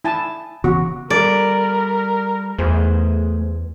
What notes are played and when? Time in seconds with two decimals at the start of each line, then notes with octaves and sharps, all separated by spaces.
0.04 E4 G#5 A5
0.64 C#3 E3 B3 F#4
1.10 G3 A4 A#4 D5
2.58 E2 A3 G#4 C5